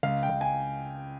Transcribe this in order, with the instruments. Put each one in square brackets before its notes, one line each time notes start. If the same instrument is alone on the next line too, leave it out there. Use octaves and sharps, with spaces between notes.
[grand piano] C#2 F5
G5
C#2
G#5